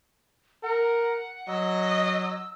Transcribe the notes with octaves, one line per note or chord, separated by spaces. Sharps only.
A#4 F#5
F#3 D#5 E6